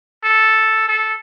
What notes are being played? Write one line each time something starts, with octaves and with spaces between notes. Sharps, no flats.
A4
A4